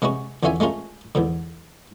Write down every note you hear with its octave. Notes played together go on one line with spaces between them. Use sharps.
C3 G#3 B3 C#4 F#4
E2 D3 C#4 F4 E5 G#5
G#3 A3 C#4 F4 A#4
E2 G#2 D3